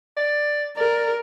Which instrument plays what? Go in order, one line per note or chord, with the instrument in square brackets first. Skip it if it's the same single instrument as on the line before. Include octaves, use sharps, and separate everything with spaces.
[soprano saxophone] D5
[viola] A#4 [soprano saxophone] D5